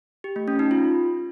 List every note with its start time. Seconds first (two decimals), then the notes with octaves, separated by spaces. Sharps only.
0.24 G4
0.36 A3
0.48 C#4
0.59 D#4
0.71 F4